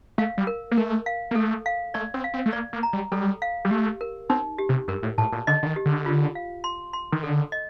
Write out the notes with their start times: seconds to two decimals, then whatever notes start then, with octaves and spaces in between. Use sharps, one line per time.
0.18 A3 F5
0.38 G3
0.47 A#4
0.71 A#3
0.77 A3 A#4
1.06 F5
1.31 A#3
1.35 A3 A4
1.66 F5
1.94 A3 D5
2.14 C4
2.24 F5
2.34 C4
2.46 A3
2.53 A#3 D5
2.73 A#3
2.83 A#5
2.93 G3
3.12 G3 A4
3.42 F5
3.65 G3
3.71 A3 G4
4.01 A#4
4.30 C4 D#4
4.58 G4
4.69 C3
4.88 G2 A#4
5.03 A2
5.18 A2 A5
5.32 A#2
5.47 D3 D#5
5.63 D3
5.66 D#3
5.76 G4
5.85 D3
6.06 F4
6.35 F5
6.64 C6
6.93 C6
7.12 D#3
7.23 D3 A4
7.52 D#5